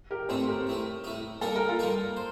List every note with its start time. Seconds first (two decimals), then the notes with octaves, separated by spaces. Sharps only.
0.11 G4 A#4
0.29 A2 A3 C4 D#4 A4 C5
0.47 G4 A#4
0.67 A2 A3 D#4
1.04 A2 A3 D#4
1.41 G3 A#3 D#4 A4 A#4
1.56 A#4
1.69 F4 A4
1.79 G3 A#3 D#4 A#4
2.16 C5